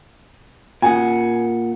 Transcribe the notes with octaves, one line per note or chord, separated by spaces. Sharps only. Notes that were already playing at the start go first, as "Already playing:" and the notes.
A#2 F#5 G#5